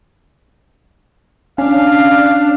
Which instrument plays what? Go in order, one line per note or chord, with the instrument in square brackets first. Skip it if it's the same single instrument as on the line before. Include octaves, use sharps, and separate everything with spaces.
[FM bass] C#4 [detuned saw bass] D4 [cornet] F5